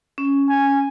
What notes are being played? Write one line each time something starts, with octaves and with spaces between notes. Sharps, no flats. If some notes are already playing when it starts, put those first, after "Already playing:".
C#4
G#5